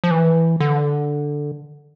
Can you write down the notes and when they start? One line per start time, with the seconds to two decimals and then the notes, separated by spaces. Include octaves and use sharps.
0.04 F3
0.11 E3
0.60 D3